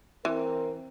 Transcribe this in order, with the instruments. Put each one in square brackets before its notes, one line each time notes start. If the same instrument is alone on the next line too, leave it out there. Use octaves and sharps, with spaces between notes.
[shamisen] E3 [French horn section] C4 A#4